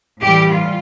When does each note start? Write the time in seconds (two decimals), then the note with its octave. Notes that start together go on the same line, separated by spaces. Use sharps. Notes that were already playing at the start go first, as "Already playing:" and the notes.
0.21 A2 E3 G3 G4
0.51 F4